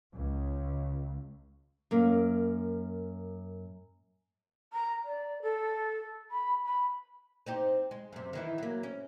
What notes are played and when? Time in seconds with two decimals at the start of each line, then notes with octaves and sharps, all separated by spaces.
0.15 C#2
1.91 F#2 A#3
4.73 A#5
5.05 D5
5.42 A4
6.31 B5
6.65 B5
7.46 C4 D#4 G4
7.91 G#3
8.12 F#2 C3
8.33 D#3 E3 E4
8.58 F#3 A#3
8.83 C#4